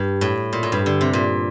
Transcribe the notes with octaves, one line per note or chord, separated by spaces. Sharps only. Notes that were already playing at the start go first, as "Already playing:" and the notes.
Already playing: G2
A2
A#2
A2
G2
D3
C3
A#2